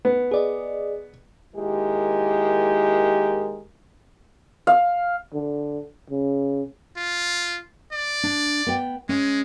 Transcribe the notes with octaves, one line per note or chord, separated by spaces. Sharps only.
B3
G#4 D5 D#5
D#2 G#3 E4 G4 A#4
F5
D3
C#3
F4
D5
D4
B3 G5
G#3 C#4